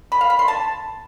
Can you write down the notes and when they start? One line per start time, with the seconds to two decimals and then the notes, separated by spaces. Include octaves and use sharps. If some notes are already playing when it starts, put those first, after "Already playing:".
0.12 B5
0.21 F5
0.30 B5
0.39 C6
0.48 A5